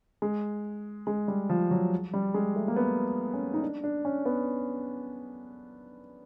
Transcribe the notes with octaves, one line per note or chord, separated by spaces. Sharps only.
G#3
G#3
G3
F3
F#3
G3
G#3
A3
A#3
B3
C#4
D#4
D4
D4
C#4
B3